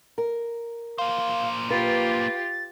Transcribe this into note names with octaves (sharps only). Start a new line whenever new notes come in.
A#4
A#3 C5 F5
F4 G4 B4 A6